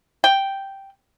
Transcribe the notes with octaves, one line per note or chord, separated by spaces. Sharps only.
G5